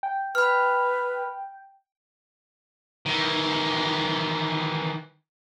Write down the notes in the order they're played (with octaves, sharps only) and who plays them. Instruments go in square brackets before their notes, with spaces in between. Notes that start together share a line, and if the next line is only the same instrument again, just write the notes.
[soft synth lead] G5
[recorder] B4 [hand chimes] B5 F6
[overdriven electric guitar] D#3 E3